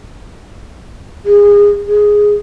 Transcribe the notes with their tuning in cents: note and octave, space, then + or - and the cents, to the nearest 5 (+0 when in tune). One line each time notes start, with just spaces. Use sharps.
G#4 -25
G#4 +0